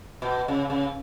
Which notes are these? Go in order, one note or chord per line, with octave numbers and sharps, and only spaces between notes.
B2
C#3
C#3